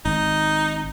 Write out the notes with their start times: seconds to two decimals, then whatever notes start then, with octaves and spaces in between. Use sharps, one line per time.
0.05 G#1 D#4